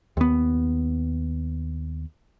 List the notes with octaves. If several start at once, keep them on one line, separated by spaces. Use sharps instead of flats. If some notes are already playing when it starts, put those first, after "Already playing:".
D#2 B3